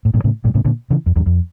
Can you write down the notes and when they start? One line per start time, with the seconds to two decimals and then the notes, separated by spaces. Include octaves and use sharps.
0.05 A2
0.14 G2 A#2
0.24 A2 C#3
0.44 G2 A#2
0.55 A2 C#3
0.65 A#2 D3
0.90 C#3 E3
1.06 F2
1.16 E2 G2
1.26 F2